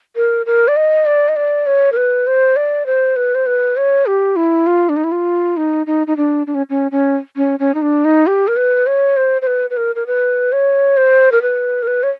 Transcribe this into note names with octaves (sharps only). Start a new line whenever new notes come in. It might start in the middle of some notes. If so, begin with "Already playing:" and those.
A#4
A#4
D5
D#5
D5
D#5
D5
C#5
A#4
B4
C5
D5
C5
B4
C5
B4
C#5
G4
E4
F4
D4
D#4
E4
F4
D#4
D#4
D#4
D4
D4
C#4
C#4
C#4
C#4
C#4
D#4
D4
D#4
G4
A#4
B4
C#5
C5
C5
B4
B4
A#4
A#4
B4
C#5
C5
A#4
B4
A#4
B4
C#5